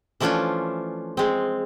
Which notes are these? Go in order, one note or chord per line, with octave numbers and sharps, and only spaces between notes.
E3 F3 A3 C#4 D4 F4
G#3 C4